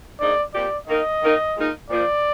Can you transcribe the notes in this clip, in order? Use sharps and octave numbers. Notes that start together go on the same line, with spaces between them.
D3 F3 A#3 D#4 G#4 D5
A#2 G3 C4 G4 D5
D#3 A#3 D#4 A#4 D#5
D#3 A#3 D#4 A#4
A#2 G#3 D#4 A#4
A#2 F3 A#3 F4 C5 D5